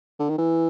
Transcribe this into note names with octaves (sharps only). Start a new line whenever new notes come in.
D3
D#3
E3